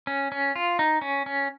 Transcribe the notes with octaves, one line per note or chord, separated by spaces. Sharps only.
C#4
C#4
F4
D#4
C#4
C#4